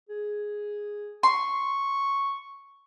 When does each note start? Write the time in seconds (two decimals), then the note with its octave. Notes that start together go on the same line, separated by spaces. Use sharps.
0.09 G#4
1.23 C6 C#6